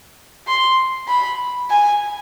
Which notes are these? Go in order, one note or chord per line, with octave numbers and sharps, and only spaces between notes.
C6
B5
G#5